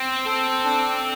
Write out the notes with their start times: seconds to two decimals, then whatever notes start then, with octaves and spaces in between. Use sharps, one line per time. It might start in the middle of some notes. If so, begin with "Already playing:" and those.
Already playing: C4
0.26 A4
0.64 D4